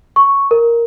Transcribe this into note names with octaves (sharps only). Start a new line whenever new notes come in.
C#6
A#4